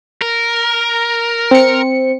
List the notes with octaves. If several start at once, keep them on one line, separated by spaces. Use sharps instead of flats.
A#4
C4 C#7